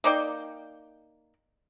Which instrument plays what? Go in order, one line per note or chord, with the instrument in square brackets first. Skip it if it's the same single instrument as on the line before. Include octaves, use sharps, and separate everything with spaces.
[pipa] A#3 D#4 D5 G5